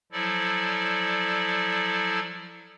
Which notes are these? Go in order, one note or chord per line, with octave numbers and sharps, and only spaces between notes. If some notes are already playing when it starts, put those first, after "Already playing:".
F3 F#3 E4 A4 D5